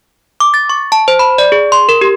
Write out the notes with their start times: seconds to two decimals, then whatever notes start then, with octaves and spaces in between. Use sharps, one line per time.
0.40 D6
0.54 A6
0.70 C#6
0.92 A5
1.08 C5
1.19 B5
1.38 D5
1.52 G#4
1.72 C6
1.89 A#4
2.01 G4